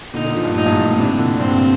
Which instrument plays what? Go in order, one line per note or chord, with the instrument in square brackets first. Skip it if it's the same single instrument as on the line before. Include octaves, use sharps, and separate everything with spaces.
[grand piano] A#2 D3 [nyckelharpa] D#4
[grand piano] A#2 D3
D3 F3
G2
[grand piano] A2 [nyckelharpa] D#4
[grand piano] G2 A#2
G2
A2
[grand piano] A2 C3 [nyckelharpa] D4
[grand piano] A#2 D3
[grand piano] G2 [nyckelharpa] C4